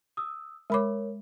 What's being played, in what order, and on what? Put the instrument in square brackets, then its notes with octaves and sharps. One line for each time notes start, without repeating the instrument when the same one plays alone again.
[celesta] D#6 E6
[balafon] G#3 B5 D6 [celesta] A#4 C#5